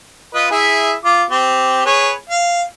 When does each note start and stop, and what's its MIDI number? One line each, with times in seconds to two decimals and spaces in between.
0.34 0.46 65
0.34 0.46 71
0.34 0.46 75
0.51 0.93 64
0.51 0.93 68
0.51 0.93 76
1.05 1.24 65
1.05 1.24 86
1.31 1.85 60
1.31 1.85 67
1.86 2.12 68
1.86 2.12 71
1.86 2.12 73
2.30 2.62 77